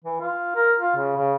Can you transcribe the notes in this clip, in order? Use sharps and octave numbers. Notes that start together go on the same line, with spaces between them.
E3
F4
A#4
F4
C#3
C#3